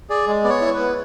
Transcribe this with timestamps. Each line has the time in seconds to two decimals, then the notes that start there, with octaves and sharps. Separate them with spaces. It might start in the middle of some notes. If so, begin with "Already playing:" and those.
0.09 G#4 D5
0.27 G#3
0.44 B3 D5
0.49 C#5
0.61 E4
0.74 B4
0.79 B3